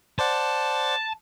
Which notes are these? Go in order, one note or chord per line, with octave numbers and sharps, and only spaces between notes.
C5 D5 F#5 A5